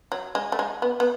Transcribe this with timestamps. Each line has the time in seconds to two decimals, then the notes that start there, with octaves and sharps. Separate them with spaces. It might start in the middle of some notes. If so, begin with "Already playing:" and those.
0.12 F#3
0.35 G#3
0.52 A3
0.59 G#3
0.82 B3
1.00 B3